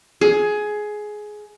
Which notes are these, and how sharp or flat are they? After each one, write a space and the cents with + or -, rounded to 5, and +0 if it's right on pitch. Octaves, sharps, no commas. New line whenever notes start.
G#4 +15